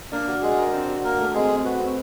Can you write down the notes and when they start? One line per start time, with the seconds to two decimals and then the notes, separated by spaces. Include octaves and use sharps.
0.12 A#3 D4 A#4
0.27 F#4
0.42 G#3 F#4 G#4
0.57 A#4
0.73 C4 D4 C5
0.88 F#4
1.04 A#3 F#4 A#4
1.19 A3
1.34 G#3 C4 G#4
1.50 C4
1.65 F#4 B4
1.80 C4